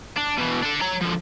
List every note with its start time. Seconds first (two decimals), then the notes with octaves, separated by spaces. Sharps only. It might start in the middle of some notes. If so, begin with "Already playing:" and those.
0.18 D4
0.38 B2 E3
0.63 D4 A4
0.81 C#5 A#5
1.01 D3 F3